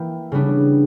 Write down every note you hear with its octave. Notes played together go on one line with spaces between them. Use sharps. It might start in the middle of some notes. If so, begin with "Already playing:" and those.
Already playing: E3 A#3 E4 G5
C#3 G3 B3 D4